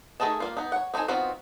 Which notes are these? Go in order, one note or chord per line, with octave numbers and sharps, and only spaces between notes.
D#3 A3 G#4 D#5 A5
G3 A#3 F4
B3 D#4
C#5 F#5
C4 D#4 E4 A4 G#5
B3 C4 D#4 F4 F#4